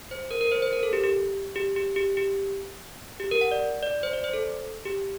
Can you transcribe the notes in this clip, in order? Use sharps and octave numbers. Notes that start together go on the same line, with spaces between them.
C5
A#4
A#4
C5
C5
A#4
A4
G4
G4
G4
G4
G4
G4
G4
A#4
F#5
D5
D5
C5
D5
C5
A4
G4